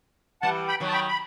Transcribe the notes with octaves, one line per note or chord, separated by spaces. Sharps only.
E3 G3 F#5 A5
G5 B5
D#3 F#3
A5
G5 B5
B5